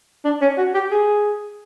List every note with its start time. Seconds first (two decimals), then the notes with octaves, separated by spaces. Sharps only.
0.24 D4
0.41 C#4
0.57 F#4
0.74 G4
0.91 G#4